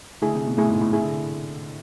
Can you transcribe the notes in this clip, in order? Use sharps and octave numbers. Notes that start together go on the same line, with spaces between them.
D3 A3 E4 G#4
C3
B2
A2 A3 E4 G#4
G#2
A2
C3 A3 E4 G#4
D3